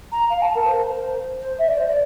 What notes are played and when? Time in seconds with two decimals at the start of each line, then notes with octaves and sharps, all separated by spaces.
0.11 A#5
0.30 F5
0.41 A5
0.55 A#4
0.66 C5
1.40 C5
1.58 E5
1.68 D5
1.77 C5
1.87 D5